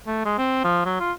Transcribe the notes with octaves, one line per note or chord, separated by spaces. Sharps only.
A3
G#3
C4
F3
F#3
F4